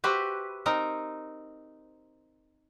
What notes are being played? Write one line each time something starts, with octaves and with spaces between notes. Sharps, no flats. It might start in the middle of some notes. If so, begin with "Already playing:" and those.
F#4 G4 B4 C5 E5
C4 D#4 A#4 A#5